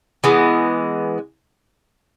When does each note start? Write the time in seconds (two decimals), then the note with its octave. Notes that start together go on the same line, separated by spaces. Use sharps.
0.24 E3 G#3 B3